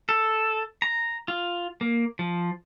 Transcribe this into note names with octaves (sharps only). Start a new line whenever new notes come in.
A4
A#5
F4
A#3
F3